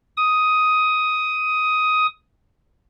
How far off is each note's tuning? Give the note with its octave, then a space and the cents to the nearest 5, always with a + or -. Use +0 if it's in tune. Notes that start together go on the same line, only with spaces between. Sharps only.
D#6 +10